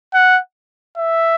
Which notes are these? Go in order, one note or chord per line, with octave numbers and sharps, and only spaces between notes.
F#5
E5